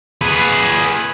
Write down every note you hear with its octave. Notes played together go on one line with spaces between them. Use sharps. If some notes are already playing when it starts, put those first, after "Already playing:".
G#4 B4